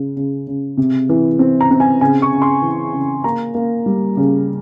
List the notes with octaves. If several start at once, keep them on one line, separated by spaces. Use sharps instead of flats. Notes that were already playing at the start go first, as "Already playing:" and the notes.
Already playing: C#3
C#3
C#3
C3
E3
C4
A#5
C4
G#5
C#3 G#5
C#6
C#3
C6
E3
C#3
A#3 A#5
A#3
G3
C#3